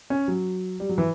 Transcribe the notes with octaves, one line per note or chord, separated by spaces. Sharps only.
C#4
F#3
G3
F#3
E3